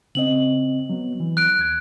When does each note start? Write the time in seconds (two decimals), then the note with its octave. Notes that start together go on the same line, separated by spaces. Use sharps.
0.15 C#3 C4 D#5 F#7
0.89 F#3 B3
1.20 E3
1.37 F#6 D7
1.59 D#2 G#6